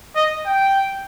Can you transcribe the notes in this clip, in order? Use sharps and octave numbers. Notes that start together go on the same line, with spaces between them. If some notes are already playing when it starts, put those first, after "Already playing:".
D#5
G5